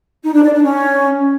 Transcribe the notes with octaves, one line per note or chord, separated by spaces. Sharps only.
D#4
D4
D5
D4
C#4